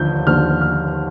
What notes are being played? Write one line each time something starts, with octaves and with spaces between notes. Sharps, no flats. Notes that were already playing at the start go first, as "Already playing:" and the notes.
Already playing: D#2 D3 F3 G6
D#2 D3 F3 F6
F6